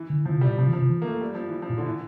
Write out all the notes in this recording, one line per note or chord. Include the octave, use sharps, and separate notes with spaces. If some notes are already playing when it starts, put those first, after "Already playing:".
Already playing: E3
D3
D3 F3
C3
G3
A#2
C3 F3
E3
F3
C3
E3
A#3
A3
G3
F3
E3
F3
A#2
D3
E3